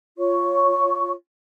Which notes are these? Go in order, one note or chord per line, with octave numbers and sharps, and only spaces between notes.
F4 C#5 C#6